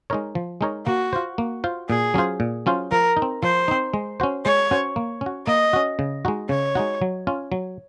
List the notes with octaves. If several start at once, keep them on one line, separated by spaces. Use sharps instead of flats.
G#3 D#4 A#4 C#5
F3
G#3 D#4 A#4 C#5
A#3 F#4
F4 C5
A#3
F4 C5
A#2 G#4
F#3 C#4 F4 C5
A#2
F#3 C#4 F4 C5
F3 A#4
D#4
C4
F3 C5
C4 D#4
G#3
C#4 F#4 C5
G#3 C#5
C#4 F#4 C5
A#3
C#4
F#4
A#3 D#5
C#4 F#4
C#3
G#3 D#4 F#4
C#3 C#5
G#3 D#4 F#4
F#3
C#4 F4
F#3